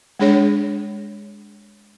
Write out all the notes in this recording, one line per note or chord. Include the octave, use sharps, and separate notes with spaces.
G#3 D4 G#4 C#5